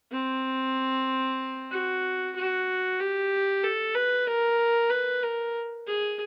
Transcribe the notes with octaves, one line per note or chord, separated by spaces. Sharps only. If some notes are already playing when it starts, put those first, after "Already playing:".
C4
F#4
F#4
G4
A4
B4
A#4
B4
A#4
G#4